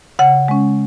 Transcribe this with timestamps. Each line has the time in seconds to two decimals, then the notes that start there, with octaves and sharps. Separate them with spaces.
0.19 C#3 F#5
0.48 G#3 C#4